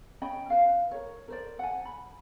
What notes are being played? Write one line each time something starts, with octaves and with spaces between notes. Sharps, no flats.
C#4 D#5 G5 B5
B4 D#5 F5
A#4 C#5
A#4 C5 D5
F#5 G#5
B5